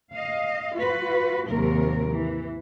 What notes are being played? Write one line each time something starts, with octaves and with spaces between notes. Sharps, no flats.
D#5 F5
F4 F#4 B4
D#2 G#2 C3 F#3 A#4
E3